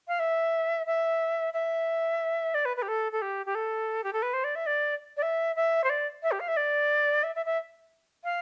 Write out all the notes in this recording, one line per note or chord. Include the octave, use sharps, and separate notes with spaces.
F5
E5
E5
E5
D5
B4
B4
G4
A4
A4
G4
G4
A4
G4
A4
B4
C5
D5
E5
D5
D5
E5
E5
C5
D5
E5
G4
F5
E5
D5
E5
E5
E5
F5